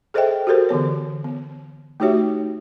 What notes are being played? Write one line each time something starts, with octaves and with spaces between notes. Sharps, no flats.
G#4 A4 C5 D#5 E5 G5
F#4 G4 A4 A#4 C5
D3 E3 B3 C#5
B3
A3 D#4 F#4 G4 C#5 E5